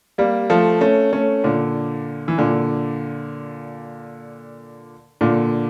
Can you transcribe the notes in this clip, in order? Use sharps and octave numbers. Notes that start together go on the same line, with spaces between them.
G3 A#3
F3 A3
A3 C#4
A3 C#4
A#2 D3
E3
A#2 D3
A#2 D3